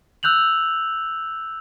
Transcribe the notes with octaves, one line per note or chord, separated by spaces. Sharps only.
E6 F#6 G6 F7 F#7